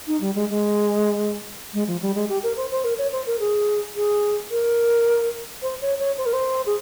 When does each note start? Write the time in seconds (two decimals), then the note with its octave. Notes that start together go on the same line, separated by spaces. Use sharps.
0.07 D#4
0.21 G3
0.35 G#3
0.49 G#3
1.74 G#3
1.87 F3
2.02 G3
2.15 G#3
2.29 G4
2.43 A#4
2.57 C5
2.71 C5
2.84 A#4
2.98 C#5
3.12 C5
3.26 A#4
3.40 G#4
3.96 G#4
4.51 A#4
5.62 C5
5.82 C#5
5.99 C#5
6.18 C5
6.26 A#4
6.33 C5
6.66 G#4